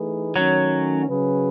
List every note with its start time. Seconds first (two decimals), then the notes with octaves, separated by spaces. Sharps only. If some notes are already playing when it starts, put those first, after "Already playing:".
Already playing: E3 A3 D#4 G#4 B4
0.35 D#3 F#3 A3 C#4
1.08 C#3 F#3 C#4 G#4 B4